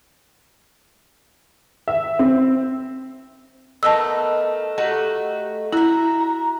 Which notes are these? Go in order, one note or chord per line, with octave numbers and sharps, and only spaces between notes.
E5
C4
A3 B3 D#4 A#4 A5 E6
A3 D#4 F#4 G4
E4 F#4 E5 A#5